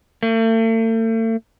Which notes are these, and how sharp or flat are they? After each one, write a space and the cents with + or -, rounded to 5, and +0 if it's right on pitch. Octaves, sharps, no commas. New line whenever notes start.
A3 +40